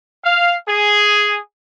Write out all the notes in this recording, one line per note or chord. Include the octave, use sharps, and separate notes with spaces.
F5
G#4